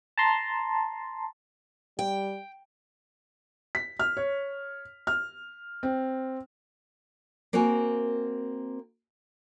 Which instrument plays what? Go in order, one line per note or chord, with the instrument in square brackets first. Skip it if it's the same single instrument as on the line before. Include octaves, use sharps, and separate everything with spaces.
[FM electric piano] A5 A#5 C6
[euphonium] G3 [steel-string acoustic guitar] G5
[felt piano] B6
F6
C#5
F6
C4
[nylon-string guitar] A#3 C4 F#4 A#4 G#5